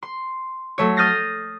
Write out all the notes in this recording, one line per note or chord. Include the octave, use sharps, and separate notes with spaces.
C6
F#3 A3 C#5
D#6 F6 G6 A6 A#6 C7